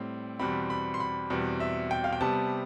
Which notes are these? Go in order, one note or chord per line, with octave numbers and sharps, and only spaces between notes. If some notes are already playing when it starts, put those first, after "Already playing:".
Already playing: A2 G3 C4
E2 B2 G3 C4 B5
B5
C6
B5
E2 B2 G3 C4
E5
G5
F5
G5
C3 G3 B3 A5